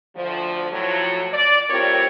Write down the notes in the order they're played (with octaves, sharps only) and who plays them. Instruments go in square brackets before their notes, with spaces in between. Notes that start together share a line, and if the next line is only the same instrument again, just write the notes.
[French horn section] D2 F3
A2 F3 F#3
D5
A2 G3 C4 F4 A#4 C#5